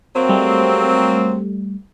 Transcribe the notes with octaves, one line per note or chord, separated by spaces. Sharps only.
F#3 A#3 C4
G3 A3